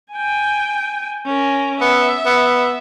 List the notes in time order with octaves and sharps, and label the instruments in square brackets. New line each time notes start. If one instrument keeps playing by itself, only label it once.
[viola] G5 G#5
C#4 A#4
[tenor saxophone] B3 [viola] E5
[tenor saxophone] B3